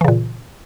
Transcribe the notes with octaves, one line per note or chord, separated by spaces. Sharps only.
A#2 C#3 E3